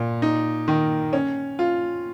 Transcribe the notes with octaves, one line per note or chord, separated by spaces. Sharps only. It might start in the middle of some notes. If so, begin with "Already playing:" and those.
Already playing: A#2
D#4
D#3
C#4
F4